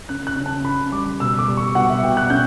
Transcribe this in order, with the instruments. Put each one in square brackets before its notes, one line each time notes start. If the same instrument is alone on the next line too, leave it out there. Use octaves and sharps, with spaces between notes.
[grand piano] C#3 F#6
F#6
C#3
A5
C#3 B5
G3 D6
B2 E6
D6
G3
C#6
B2 F#5
E5
B2 G5
F#6
C#3 G6